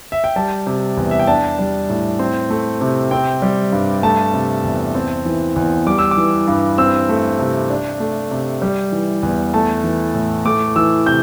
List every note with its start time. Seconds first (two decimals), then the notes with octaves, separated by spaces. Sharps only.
0.12 E5
0.24 G5
0.36 G3 A5
0.67 C3
0.97 E2
1.11 E5
1.20 G5
1.27 D4 A5
1.59 G3
1.89 A2
2.19 C4
2.50 A3
2.81 C3
3.11 C4 G5
3.42 G3
3.72 G2
4.03 A3 A5
4.34 C3
4.64 E2
4.95 C4
5.26 E3
5.56 E2
5.87 G3 D6
5.98 E6
6.11 D6
6.17 E3
6.47 G2
6.78 C4 E6
7.09 A3
7.39 C3
7.70 D4
8.00 A3
8.31 C3
8.62 G3
8.92 E3
9.23 E2
9.53 A3 A5
9.84 E3
10.14 A2
10.45 A3 D6
10.76 E3 E6
11.06 C3 G6